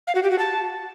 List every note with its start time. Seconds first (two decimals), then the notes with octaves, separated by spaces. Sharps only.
0.07 F5
0.15 F#4
0.23 G4
0.31 F#4
0.39 A5